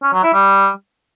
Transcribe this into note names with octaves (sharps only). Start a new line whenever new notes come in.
C#4
F#3
E4
G3